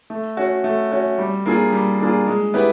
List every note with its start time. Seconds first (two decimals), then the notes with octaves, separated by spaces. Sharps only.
0.10 A3
0.37 C#4 F#4
0.64 A3
0.92 C#4 F#4
1.18 G3
1.46 A#3 D4 F4 G#4
1.72 G3
2.00 A#3 D4 F4 G#4
2.27 G#3
2.54 B3 E4 G4 B4